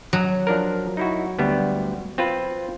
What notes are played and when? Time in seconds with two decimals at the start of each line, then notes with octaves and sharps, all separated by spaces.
0.13 F#3
0.47 F3 D4 A#4
0.97 D#4 E4 F#4
1.39 D2 G3 B3
2.18 C4 F4 B4